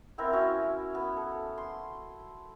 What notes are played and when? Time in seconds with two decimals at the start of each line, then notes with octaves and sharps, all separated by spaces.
0.18 B3 C4 E4 A#4
0.33 C#4 E4 F#4
0.95 B3
1.17 A4
1.58 C6